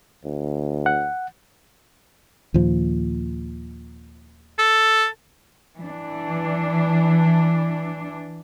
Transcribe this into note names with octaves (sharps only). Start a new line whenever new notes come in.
D2
F#5
D#2 A#2 F3
A4
E3 D4